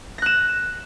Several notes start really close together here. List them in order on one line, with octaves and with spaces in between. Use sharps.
A#6 F#6 E7